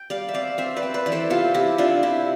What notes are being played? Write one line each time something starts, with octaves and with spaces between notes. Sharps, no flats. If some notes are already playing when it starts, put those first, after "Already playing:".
Already playing: G5
G3 D5 F5
E5
C4 D5 F5
C4 C5 E5
B4 D5
C4
B4 D5
E3 D5
A4 C5
C3 F4 A4
C3 E4 G4
C3 D4 F4
C3 E4 G4